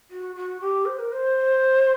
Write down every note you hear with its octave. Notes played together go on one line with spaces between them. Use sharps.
F#4
F#4
G4
C5
A#4
C5